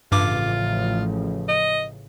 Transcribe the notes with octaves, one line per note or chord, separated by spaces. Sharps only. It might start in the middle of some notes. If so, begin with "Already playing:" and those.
A1 G2 C#3 F3 F4 D6
D#5